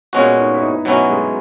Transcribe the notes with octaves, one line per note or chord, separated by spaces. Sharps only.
A#2 G#3 B3 C#4 F#4
D#4
E4
D#4
B2 F#3 B3 C#4 E4
G#3